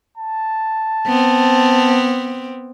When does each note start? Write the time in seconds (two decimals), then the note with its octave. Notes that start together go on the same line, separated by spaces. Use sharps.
0.17 A5
1.06 B3 C4